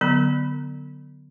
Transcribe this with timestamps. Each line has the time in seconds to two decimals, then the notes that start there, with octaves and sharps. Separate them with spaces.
0.01 D3 F#3 B3 B5